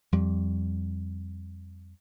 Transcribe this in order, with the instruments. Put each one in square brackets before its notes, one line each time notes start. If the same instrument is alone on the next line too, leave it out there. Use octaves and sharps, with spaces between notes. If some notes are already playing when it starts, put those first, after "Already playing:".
[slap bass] F2 G3